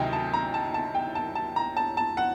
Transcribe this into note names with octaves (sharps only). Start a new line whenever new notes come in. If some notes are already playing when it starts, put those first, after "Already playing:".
Already playing: D2 C3 D#3 F#3 D#5 G5
A5
A#5
A5
A5
G5
A5
A5
A#5
A5
A5
F#5